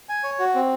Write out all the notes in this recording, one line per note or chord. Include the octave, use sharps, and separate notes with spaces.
G#5
C#5
F#4
C4